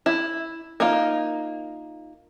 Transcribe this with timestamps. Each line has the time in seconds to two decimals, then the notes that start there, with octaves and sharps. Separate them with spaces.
0.06 E4
0.80 A#3 D#4 F4